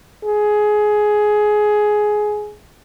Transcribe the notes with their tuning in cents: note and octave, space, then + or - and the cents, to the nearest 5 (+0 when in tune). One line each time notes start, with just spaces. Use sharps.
G#4 +15